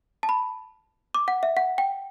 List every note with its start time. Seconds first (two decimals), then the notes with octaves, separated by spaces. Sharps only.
0.23 A5
0.29 B5
1.15 D6
1.28 F#5
1.43 E5
1.57 F#5
1.78 G5